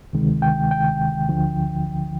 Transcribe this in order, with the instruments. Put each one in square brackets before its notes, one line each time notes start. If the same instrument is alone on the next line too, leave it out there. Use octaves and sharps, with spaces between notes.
[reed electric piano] D2 C3 D#3 G#3
G5
G5
D2 D3 F3